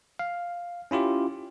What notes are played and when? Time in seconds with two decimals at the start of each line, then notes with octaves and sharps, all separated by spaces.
0.19 F5
0.91 C#4 E4 F4 G4